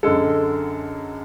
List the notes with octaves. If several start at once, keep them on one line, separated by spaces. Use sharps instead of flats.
F#2 D3 G#3 A4